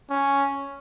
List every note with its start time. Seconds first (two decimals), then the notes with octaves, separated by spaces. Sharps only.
0.10 C#4